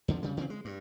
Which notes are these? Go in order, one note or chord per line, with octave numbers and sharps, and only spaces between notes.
F2 D3 F3
C#3 G3
C#3 E3 A#3 C4
G#3
G2